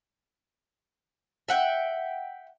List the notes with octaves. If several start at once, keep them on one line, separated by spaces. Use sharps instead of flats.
E5 F#5 G5